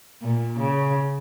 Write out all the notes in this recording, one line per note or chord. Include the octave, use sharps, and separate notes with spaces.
A#2
C#3